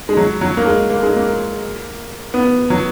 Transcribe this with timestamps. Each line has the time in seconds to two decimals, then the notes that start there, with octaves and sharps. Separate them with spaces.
0.09 G#3
0.17 F#3
0.41 F#3
0.57 A#3
0.66 G#3
0.90 A#3
1.03 G#3
1.16 A#3
2.34 B3
2.70 F#3